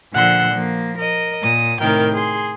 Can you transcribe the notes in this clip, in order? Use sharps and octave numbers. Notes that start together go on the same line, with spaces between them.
A#2 D3 F3 F#5 C6 E6
F3 A#3
A#4 D#5
A#2 D#6
A2 C3 D#3 A#4 G5
G#4 C6